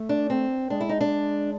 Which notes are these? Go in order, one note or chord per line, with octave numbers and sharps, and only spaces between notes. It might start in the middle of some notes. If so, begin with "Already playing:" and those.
Already playing: A3
D4
C4
G#3 D4
E4
D#4
D4